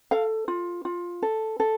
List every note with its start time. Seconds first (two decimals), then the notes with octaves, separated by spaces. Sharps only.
0.11 A4 F5
0.48 F4
0.85 F4
1.22 A4
1.60 A4